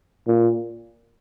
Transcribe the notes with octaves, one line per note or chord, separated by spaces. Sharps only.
A#2